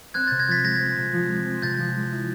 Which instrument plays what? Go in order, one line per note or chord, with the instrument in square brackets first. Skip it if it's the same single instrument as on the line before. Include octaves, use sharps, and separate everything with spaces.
[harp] C4 [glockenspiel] F#6 G#6
[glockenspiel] G6 A6
[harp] C3
[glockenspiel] G#6 A#6
[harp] F3 [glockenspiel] A6 B6
[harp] G#3 [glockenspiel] G#6 A#6
[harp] C4
C3
F3
G#3
C4
[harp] C3 [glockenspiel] G6 A6
[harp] F3
G#3
E4